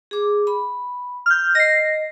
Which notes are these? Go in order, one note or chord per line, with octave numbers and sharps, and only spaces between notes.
G#4 D6
B5
F6 G6
D#5 A#6 C7